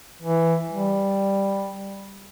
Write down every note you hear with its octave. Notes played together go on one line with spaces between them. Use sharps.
E3
G3